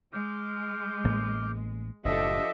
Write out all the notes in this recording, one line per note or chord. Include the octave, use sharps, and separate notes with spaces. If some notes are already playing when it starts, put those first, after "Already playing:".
G#3 D6 F6 G6
A1 A2 A#3
F#1 A2 F3 D4 G4 A4 D#5 E5